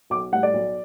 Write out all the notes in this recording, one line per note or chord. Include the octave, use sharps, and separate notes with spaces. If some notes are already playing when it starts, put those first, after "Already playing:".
B1 D6
A2 G3 F#5
D5
B1